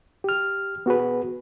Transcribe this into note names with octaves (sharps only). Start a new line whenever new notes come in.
G4 F6
B3 F#4 G#4 B4